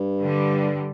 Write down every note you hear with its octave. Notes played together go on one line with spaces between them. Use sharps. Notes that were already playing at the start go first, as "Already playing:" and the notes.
Already playing: G2
D3 G3